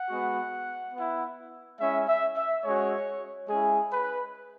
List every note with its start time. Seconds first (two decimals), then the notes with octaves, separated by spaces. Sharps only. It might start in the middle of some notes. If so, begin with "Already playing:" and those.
Already playing: F#5
0.10 G#3 B3 F#4
0.94 B3 E4
1.80 G#3 C#4 E4 E5
2.07 E5
2.36 E5
2.64 G#3 C#4 F#4 C#5
3.49 G#3 C#4 E4 G#4
3.92 B4